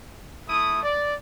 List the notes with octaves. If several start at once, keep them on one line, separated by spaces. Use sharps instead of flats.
A3 E4 D#6
D5